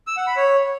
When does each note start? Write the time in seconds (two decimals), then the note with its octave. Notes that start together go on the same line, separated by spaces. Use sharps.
0.07 E6
0.17 F#5
0.27 B5
0.37 C#5